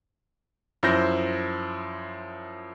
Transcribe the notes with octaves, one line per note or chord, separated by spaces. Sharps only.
F#2 F3 E4 C5 G6 A#6